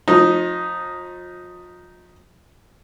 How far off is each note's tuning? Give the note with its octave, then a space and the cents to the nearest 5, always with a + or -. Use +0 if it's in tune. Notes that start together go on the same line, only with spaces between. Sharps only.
F3 +35 D#4 +0